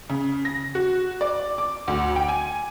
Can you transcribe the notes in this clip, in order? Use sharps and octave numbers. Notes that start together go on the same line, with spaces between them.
C#3
A#6
F#4
D5
D6
D2
G5
G#5